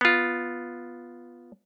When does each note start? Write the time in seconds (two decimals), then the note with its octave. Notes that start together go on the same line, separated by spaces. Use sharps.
0.01 B3 F4